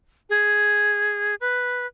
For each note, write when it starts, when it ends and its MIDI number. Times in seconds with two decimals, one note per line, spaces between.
0.30 1.35 68
1.41 1.86 71